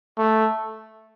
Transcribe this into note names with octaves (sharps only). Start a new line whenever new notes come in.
A3